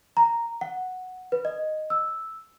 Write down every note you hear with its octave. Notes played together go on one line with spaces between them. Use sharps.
A#5
F#5
B4
D#5
E6